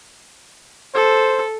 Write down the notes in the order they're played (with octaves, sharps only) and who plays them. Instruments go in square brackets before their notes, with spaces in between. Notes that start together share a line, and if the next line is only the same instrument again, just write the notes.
[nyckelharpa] A4 [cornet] C5